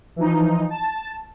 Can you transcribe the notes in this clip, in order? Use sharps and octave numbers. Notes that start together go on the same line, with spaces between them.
E3 F3 D#4
A5